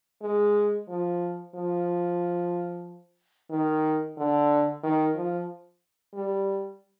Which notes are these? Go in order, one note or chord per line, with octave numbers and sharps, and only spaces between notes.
G#3
F3
F3
D#3
D3
D#3
F3
G3